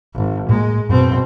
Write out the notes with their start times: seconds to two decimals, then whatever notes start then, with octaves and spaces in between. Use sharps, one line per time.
0.14 G#1
0.49 A2 G#3 A#3
0.89 F#2 B2 C4